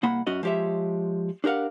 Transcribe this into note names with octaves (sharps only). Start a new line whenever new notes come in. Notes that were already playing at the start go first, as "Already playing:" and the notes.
C2 A#3 F#5 B5
F#2 C#4 F#4 D#5
F3 G#3 G4 C#5 E5
D4 G4 A#4 F5 F#5